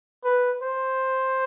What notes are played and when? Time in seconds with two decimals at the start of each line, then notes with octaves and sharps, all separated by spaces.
0.25 B4
0.63 C5